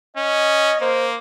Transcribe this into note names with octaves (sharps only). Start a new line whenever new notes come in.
C#4 D#5
A#3 C5